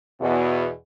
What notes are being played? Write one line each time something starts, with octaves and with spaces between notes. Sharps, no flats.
E2 B2